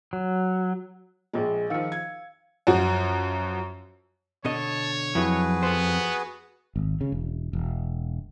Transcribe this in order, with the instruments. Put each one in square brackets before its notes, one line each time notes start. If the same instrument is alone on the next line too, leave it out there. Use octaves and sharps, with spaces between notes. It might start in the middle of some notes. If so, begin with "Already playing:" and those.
[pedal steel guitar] F#3
[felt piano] A#1 G#3 [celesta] F4 G#4
[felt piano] D#3 F3 [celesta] F5 E6 C#7
[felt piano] G#6
[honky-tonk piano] F#2 F3 F#4
[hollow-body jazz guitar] B2 D3 D#5 [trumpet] C#5 [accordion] A5
[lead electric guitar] F2 [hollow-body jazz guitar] F#3 E4 [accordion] F#4 G#4 B4
[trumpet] B3 [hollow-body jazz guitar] A4 C5
[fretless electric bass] G#1
C#3
E1
E1